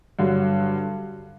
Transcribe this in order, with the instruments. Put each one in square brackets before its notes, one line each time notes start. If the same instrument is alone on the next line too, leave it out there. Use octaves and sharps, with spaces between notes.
[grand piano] G2 D3 F#3